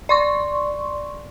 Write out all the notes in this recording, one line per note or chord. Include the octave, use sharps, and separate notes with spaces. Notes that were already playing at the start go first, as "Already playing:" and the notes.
D5 C6 C#6